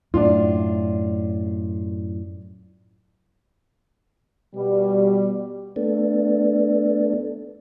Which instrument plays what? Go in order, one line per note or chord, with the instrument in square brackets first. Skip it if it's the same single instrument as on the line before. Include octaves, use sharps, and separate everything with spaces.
[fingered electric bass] F#2 A2 [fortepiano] D4 F4
[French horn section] B2 G3
[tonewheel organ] A3 B3 D4